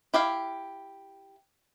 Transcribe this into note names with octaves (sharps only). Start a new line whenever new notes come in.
E4 G4 E5 F5